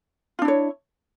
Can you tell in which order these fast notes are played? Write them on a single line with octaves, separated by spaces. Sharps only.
F4 D4 E4 C#5